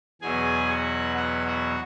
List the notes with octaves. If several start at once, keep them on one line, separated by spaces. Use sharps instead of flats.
E2 B2 F#3 G#4 G#5
F#4 F#5
F#4 F#5
F#4 F#5